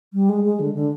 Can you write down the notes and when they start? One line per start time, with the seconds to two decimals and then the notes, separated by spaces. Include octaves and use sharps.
0.14 G3
0.29 G#3
0.45 G#3
0.60 D3
0.75 D3